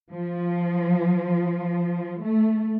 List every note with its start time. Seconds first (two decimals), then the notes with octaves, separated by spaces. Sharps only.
0.12 F3
2.23 A3